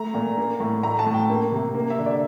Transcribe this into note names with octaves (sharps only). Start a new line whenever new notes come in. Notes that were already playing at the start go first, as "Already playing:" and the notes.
Already playing: A3 A#5
A#2
A#3
A2
A3 A#5
A5
A2
G5
A#3
C3
A#3
E5
D3
D5